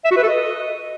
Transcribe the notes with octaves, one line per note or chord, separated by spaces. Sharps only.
E5
F#4
B4
A4
D#5